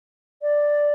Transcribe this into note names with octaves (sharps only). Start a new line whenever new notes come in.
D5